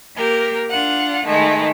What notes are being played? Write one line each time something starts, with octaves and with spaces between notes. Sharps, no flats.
A#3 G4 A#4
D4 F4 F#5
D#3 G#3 A3